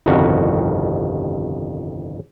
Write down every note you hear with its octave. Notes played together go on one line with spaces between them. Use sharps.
G1 C2 F2 D#3 F#4